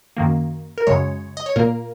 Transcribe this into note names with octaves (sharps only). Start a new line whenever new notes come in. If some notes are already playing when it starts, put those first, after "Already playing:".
F#2 D#3 A#3
A#4
F#2 C#3 G#3 C#5
D#5
C#5
A#2 A#3 A#4